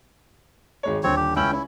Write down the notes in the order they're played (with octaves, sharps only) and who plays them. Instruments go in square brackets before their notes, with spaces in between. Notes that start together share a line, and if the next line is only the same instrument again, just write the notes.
[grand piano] G#1 G#3 C#5
[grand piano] D#1 D3 [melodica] C4 C#5
[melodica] G4
[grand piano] C#2 E6 F#7 [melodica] C#4 E4 G5
[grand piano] C#4 [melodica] E4